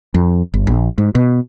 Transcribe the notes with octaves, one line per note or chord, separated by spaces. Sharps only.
F2
G1
A#1
G#2
B2